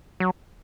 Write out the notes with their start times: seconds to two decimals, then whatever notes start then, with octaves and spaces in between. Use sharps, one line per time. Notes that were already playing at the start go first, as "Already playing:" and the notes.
0.20 F#3